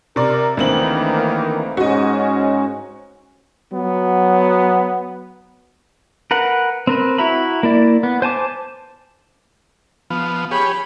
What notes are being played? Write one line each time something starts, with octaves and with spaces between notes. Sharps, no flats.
C3 A#4 D5
D2 D#3 E3 A#3 C4 F#7
G#2 C#4 F#4 D#5
F#3 B3
A#4 B4 F#5
C4 A#4 B4
E4 F#4 E5 A#5 B5
A#3 E4 D5
B3
C5 G#5 A5 D6
F3 B3
G4 G#4 C#5 B5